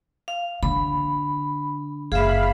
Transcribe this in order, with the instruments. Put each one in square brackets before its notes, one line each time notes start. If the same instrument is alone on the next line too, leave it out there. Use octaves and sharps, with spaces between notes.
[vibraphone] F5
[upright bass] D3 [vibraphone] B5
[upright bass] F#1 [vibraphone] G#4 E5 [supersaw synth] F5 B5